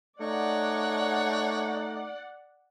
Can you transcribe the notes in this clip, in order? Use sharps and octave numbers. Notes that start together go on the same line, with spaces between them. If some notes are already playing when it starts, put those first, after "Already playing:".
A3 D#4 C#5 D5 F#5